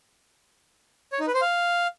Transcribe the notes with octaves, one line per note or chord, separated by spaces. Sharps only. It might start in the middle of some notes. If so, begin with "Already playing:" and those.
C#5
D#4
B4
C5
F5